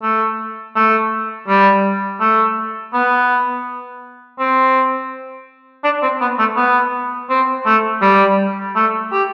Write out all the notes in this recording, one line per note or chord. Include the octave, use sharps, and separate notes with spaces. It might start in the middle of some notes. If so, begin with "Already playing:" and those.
A3
A3
G3
A3
B3
C4
D4
C4
B3
A3
B3
C4
A3
G3
A3
G4